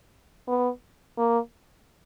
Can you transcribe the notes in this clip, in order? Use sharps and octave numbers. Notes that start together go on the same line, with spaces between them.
B3
A#3